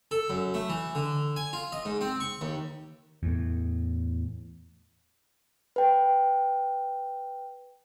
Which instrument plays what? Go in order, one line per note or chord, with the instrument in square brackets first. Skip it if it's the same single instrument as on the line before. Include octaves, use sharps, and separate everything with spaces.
[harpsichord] A4
F#2
A3
E3
D3
G#5
F4
D#5
G#2
C4
C#6
D#2
[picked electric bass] E2 A2
[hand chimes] B4 G5